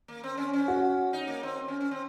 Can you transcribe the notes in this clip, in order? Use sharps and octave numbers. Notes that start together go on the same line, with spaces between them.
A#3
C4
C#4
C#4
F#4
D#4
A#3
C4
C#4
C#4
C4